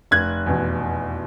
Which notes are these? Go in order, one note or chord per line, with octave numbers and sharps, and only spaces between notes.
F1 F#6 G#6
E2 B2